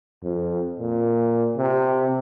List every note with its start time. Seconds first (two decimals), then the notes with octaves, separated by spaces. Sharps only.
0.23 F2
0.80 A#2
1.57 C3